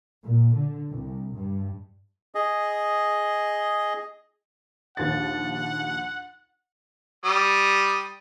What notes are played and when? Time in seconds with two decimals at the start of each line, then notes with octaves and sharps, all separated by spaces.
0.22 A#2
0.55 D3
0.91 C2
1.36 G2
2.35 G#4 D#5
4.97 A#1 D#2 F#5 A6
7.25 G3 D#6